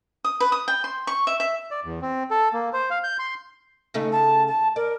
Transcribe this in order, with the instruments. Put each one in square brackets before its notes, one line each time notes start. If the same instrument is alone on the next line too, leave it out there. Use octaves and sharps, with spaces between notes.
[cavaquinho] D#6
B4
D#6
G5
C6
C#6
E5
E5
[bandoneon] D5
E2
C4
A4
A#3
C5
F5
G6
C6
[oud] C#3 A3 D#4
[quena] A5
A5
[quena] A#4 [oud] D5